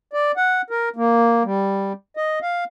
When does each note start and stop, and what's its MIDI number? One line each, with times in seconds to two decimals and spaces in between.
0.13 0.32 74
0.37 0.62 78
0.70 0.89 70
0.96 1.43 58
1.44 1.93 55
2.17 2.39 75
2.42 2.64 77